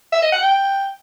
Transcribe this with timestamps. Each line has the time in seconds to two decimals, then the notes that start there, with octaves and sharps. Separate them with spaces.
0.12 E5
0.22 D#5
0.32 F#5
0.42 G5